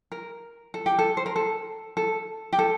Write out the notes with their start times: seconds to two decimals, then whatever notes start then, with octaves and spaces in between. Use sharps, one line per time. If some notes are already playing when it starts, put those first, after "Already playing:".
0.12 A#4
0.74 A4
0.86 G4
0.99 A4
1.17 C5
1.26 A#4
1.36 A4
1.97 A4
2.53 G4
2.59 A4